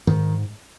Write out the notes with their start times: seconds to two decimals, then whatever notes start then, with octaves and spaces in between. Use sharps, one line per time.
0.07 G#2 D#3